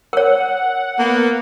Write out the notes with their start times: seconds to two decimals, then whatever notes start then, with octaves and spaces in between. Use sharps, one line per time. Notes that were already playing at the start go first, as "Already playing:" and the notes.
0.13 A#4 C#5 F#5
0.99 A#3 B3